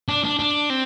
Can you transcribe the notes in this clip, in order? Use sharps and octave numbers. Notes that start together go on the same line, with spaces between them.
D4
D4
D4
C4